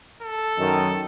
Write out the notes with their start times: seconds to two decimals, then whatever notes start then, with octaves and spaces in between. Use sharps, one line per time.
0.23 A4
0.58 F#2 D#3